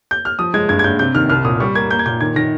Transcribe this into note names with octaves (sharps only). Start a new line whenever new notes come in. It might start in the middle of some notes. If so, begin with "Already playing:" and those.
G6
F6
F3 D#6
G#3 G#6
G2 G#6
G#6
G2 G6
C3 G6
D#3 F6
C2 F6
A#2 D#6
G3 C#6
A#3 G#6
A#3 G6
G#6
A#2 G6
D#3 G#6
D#3 A#6